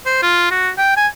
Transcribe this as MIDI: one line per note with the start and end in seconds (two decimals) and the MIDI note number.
0.06 0.19 72
0.23 0.49 65
0.51 0.70 66
0.78 0.93 79
0.97 1.07 80